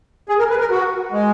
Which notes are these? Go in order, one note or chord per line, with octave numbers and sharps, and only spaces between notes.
G#4
A#4
B4
A#4
F#4
G#3